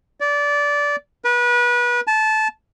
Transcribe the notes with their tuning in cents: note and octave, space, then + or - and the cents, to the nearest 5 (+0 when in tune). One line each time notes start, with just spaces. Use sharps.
D5 -20
B4 -30
A5 -20